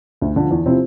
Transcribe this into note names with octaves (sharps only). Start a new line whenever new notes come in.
D2
D3 F3
E2
C3 F3 C4 E4